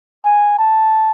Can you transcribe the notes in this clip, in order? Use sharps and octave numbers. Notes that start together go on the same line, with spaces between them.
G#5
A5